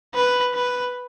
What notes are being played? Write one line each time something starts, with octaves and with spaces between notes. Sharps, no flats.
B4
B4